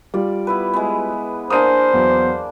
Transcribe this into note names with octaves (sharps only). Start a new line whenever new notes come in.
G3 F4 D5
B3 E4 B4
G#3 B3
A#3 D4 G#4 C5 D#6 D#7
E2 F#3